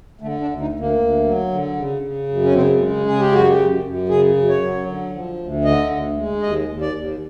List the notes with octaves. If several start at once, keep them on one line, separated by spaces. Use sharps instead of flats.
D3 A3
D4
D2
D#4
D2
A#3
D2
F#3
D3
C#3
C#3
F#2
C#4
C#3 C4
G#3
C#3 G#4
G4
F#2 F#4
G4
F#2
F#2
C#3 G#4
F#2
C#5
F#3
D3
F3
D2
D3 D#5
D2
G#3
D#2 D#5
D#2
D5
D#2